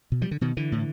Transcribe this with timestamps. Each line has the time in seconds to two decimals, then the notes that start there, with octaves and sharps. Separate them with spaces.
0.12 B2
0.22 F3 G3
0.31 D3
0.41 B2 D#3
0.57 D3 E3
0.72 A2